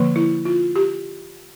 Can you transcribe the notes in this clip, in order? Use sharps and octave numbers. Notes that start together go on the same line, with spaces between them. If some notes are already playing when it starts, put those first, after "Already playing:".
Already playing: D3 F3 A#3
E4
F4
G4